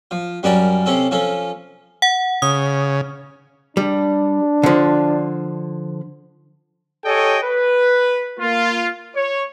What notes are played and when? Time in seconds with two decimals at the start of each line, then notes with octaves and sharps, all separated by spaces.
0.11 F3
0.43 F#2 G3 C#4 A#4 D5 A5
0.86 C3 C4 C#4 A4
1.11 F3 C#4 A4
2.02 F#5
2.42 C#3 D#6
3.77 G3 D4
4.63 D3 F3
7.05 G4 A4 C#5 D#5 G5 G#5
7.43 B4
8.39 A#3 F4
9.15 C#5